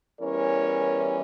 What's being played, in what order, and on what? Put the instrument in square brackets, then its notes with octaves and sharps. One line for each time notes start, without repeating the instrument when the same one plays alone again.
[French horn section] E2 E3 G3 C#4 A#4 C#5